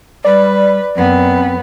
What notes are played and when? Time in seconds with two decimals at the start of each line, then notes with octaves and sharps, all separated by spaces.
0.24 G3 B4 D5
0.96 F#2 B3 C4